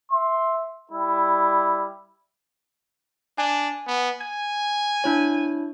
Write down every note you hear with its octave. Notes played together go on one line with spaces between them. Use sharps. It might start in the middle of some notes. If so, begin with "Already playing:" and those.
E5 C6
G3 E4
D4 G#5
B3
G#5 G#6
D4 E4 C#5